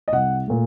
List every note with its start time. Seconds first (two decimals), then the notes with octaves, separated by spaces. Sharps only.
0.08 D#5
0.12 C2 F#5
0.48 A#2 A3